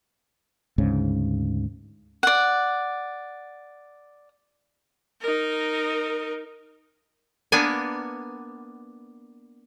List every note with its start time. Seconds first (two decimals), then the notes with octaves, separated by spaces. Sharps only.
0.78 D2 G#2 C#3
2.23 D5 F#5
5.21 D#4 A#4
7.52 A#3 B3 D4 G#5